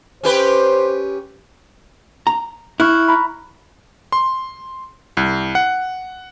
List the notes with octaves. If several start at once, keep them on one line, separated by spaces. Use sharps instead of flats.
C#4 G4 B4 C5
A#5
E4 C#6 F6 F#6
A#5 B5
C6
C2
F#5